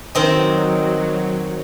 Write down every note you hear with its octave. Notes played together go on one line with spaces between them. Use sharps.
D#3 F#3 C4 D#5